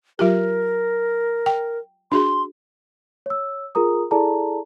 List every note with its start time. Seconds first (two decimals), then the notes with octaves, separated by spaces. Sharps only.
0.19 F#3 F4 G4 A#4
1.46 G5
2.12 D4 F#4 G#4 C6
3.26 C#5 E6
3.75 F4 G#4 A#4 A#5 D#6
4.11 E4 G#4 A4 D5 A5 A#5